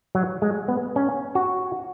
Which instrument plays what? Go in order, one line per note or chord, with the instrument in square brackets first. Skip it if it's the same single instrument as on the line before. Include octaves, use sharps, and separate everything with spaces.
[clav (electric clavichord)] F#3
G#3
B3
C#4
F#4